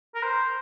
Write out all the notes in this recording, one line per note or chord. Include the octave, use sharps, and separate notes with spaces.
A#4
C5